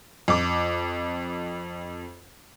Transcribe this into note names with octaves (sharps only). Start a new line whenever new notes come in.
F2 D6